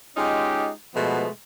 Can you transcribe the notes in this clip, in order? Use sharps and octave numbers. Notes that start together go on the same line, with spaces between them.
G#3 C#4 D#4 F4 G4
B2 F3 G#3 A3 B3